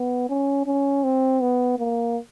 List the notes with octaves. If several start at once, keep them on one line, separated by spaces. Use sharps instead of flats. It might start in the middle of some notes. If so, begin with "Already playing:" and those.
Already playing: B3
C#4
C#4
C4
B3
A#3